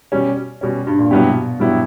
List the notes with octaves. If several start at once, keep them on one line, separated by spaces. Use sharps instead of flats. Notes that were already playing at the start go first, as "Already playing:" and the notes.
B2 G3 C#4
B2 G3 C#4
G2
A#2
G2 B2 F#3 B3 E4 G4
G2 F#3 B3 E4 G4